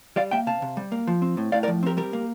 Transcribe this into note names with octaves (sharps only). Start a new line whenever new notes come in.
G3 D5 F5
A#3 E5 G5
C3 F5 A5
C3
G3
A#3
F3
C4
A2
A2 D5 F5
A#4 D5
F3
C4 G4 A#4
G3 G4 A#4
A#3